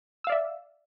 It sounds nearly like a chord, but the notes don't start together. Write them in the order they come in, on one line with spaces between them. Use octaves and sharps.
E6 F5 D5 E5